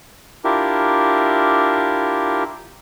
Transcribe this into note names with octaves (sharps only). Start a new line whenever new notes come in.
D4 E4 F4 G4 A#4